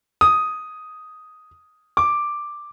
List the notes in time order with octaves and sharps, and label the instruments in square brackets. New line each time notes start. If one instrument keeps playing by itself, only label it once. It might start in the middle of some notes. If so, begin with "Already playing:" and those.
[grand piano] D#6
D6